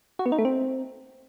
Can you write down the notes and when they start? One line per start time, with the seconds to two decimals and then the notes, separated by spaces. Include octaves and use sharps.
0.19 F#4
0.26 B3
0.32 D#4
0.39 A3
0.45 C4